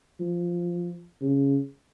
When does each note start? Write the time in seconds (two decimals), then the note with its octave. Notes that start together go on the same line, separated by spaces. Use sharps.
0.20 F3
1.22 C#3